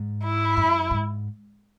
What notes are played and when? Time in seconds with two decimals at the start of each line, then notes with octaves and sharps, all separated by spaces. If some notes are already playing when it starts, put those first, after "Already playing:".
Already playing: G#2
0.23 E4
0.57 F#2
0.91 G#2